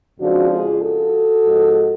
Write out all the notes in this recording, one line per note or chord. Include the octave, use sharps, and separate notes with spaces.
F2 C#3 F3 G#3 D4 F#4
F4 G#4
F#4 A4
G#2 F3 G#3